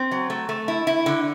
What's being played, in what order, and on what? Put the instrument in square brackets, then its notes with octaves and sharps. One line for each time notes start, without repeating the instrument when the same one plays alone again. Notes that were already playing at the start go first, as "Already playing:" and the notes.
Already playing: [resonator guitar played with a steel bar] C4
F#3
A3
A3
E4
E4
D3